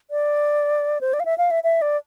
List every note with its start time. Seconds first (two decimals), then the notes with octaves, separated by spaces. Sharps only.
0.11 D5
1.01 C5
1.13 D5
1.20 F5
1.25 E5
1.38 F5
1.51 E5
1.64 E5
1.82 D5